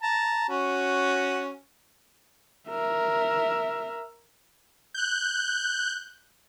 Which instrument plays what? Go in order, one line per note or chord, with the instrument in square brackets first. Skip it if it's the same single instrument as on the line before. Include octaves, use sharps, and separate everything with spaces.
[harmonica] A5 A#5
C#4 F#4
[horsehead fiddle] A#4 E5
[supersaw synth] F#6 G6